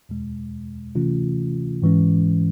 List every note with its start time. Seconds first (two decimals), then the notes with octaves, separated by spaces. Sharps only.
0.09 E2 B2 G#3
0.95 C3 E3 A3 C#4 F4
1.82 G#2 E3 G#3 C#4